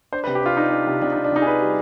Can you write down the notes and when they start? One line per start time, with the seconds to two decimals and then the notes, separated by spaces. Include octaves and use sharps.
0.12 D4 C5
0.24 B4
0.27 C3
0.35 G4
0.42 D4 F4
0.57 D4 D#4
0.71 D4
0.87 C3
1.02 C3 D4
1.12 D#4
1.16 C3
1.24 D4
1.32 C3 D#4
1.42 G#4
1.46 D4 B4
1.61 G3